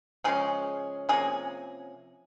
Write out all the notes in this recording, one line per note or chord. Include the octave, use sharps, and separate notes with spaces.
C#3 F3 G#3 C#4 G#4
C3 F3 A#3 C#4 G#4